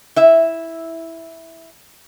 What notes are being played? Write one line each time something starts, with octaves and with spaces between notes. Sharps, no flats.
E4 E5